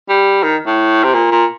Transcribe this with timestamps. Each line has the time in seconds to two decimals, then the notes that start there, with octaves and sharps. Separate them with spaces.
0.09 G3
0.43 D#3
0.66 A2
1.03 C3
1.14 A#2
1.31 A#2